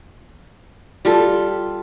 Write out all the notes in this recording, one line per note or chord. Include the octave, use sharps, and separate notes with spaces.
G3 F4 A4